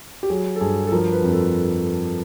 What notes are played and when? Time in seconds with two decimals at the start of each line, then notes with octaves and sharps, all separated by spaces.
0.23 G4
0.30 F#3 G#4
0.56 A4
0.61 G2 G#4
0.87 A4
0.92 F3 A#4
1.12 B4
1.23 F2
1.33 A4